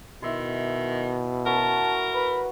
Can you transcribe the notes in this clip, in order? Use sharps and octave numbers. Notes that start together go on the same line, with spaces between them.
B2 D#3 E4 E5 C6
C#4 F#4 A#4 B4 A5
B4 B5